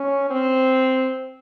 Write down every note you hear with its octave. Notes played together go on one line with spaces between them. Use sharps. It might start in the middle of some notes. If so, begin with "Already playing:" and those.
Already playing: C#4
C4